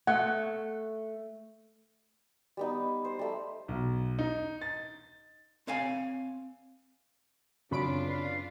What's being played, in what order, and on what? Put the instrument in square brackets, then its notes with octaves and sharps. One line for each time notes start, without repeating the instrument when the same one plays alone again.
[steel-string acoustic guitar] A3 [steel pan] F#5
[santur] G3 B3 D#4
C5
G3 A3
[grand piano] B1
D#4
A6
[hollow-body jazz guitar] C4 C#5 F5 G#5
[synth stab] F#2 B5 D7 [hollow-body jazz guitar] C#3 C4 C#5 [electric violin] D4 F4
[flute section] B4 D5 F5